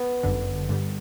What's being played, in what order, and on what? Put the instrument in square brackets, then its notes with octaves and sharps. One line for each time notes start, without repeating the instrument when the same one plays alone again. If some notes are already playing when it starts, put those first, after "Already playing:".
Already playing: [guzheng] B3
[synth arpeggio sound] G1 F#2 D3
G2 D3 G3